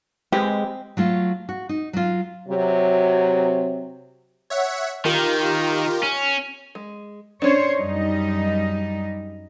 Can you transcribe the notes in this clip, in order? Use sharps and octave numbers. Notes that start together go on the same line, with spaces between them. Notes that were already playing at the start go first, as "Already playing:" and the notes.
G#3 C4 G4 B4
F#3 A3 F4
F#4
D#4
F#3 F4
C3 F#3
C#5 E5 F#5
D#3 F4 G4 A#4
C#4
G#3
C#4 D4 C5 C#5
F#2 G3 D#4